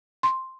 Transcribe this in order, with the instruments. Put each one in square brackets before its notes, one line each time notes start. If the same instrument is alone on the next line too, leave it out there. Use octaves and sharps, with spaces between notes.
[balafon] C6